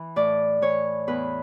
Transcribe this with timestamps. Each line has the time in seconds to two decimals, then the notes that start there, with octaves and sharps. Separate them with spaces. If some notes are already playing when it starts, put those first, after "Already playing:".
Already playing: E3
0.16 A2 D5
0.62 E3 C#5
1.07 E2 B4